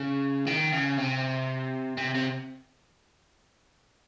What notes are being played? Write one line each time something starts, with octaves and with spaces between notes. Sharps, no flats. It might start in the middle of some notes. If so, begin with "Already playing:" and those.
Already playing: C#3
D#3
C#3
C3
C3
C3